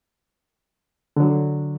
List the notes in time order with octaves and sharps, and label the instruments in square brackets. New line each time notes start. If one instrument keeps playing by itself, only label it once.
[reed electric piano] D3 F#3